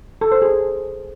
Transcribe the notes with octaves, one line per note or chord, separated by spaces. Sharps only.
A4
C5
G#4